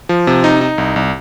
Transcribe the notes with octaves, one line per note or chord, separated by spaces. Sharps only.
F3
C3
D#4
D#4
C2
C2